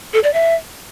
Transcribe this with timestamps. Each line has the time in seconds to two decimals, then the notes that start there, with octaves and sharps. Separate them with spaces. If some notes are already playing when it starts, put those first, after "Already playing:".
0.14 A4
0.24 D5
0.34 E5